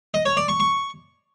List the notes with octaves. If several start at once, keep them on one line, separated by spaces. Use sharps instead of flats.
D#5
C#5
D5
C#6
C#6